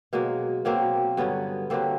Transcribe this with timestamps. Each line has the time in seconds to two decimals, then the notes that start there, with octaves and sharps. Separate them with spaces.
0.13 B2 F#3 G#3 A#3
0.65 B2 F#3 A#3 C4
1.17 G2 D3 F#3 B3 C#4
1.70 G2 D3 F#3 A#3 C4